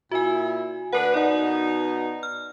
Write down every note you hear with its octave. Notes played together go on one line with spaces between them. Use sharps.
A#2 E4 F#4 G#5
D2 D4 A#4 B4 F#5
B2 D#4 D5 F#5
F6